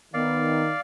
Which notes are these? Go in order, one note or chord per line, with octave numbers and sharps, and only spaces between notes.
D#3 B3 D5 F5